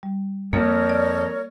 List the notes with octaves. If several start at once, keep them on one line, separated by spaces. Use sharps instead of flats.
G3
F2 A#3 A#4 C#5
D5